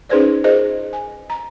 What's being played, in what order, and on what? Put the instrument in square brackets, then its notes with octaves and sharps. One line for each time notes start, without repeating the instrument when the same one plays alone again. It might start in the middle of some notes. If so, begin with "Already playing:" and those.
[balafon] C#4 D#4 G#4 B4 C5 D5
F4 G#4 A#4 C5 D#5
G#5
A#5